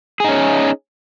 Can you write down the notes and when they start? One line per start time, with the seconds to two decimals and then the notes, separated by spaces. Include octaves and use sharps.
0.20 G#4
0.24 D#4
0.29 C#4